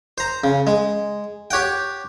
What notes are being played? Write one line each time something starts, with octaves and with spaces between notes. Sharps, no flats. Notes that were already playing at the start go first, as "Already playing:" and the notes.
C5 A#5
C#3
G#3
G4 C#5 F#5 G5